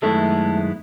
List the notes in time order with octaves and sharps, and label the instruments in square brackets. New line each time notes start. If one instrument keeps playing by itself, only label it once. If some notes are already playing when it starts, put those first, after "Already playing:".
[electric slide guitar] F#2 D#3 G#3 B3 E4 [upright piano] A3 A4